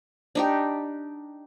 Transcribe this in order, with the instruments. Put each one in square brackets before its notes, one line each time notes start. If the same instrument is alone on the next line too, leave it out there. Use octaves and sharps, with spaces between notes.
[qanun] D4 D#4 G4